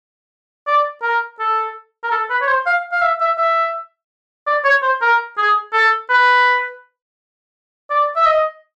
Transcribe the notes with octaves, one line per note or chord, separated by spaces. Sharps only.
D5
A#4
A4
A#4
A4
B4
C#5
C5
F5
F5
E5
E5
E5
D5
C#5
C5
A#4
G#4
A4
B4
D5
E5
D#5